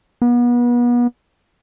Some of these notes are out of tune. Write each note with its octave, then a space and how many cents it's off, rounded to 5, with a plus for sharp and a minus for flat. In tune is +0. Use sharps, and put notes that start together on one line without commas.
B3 -35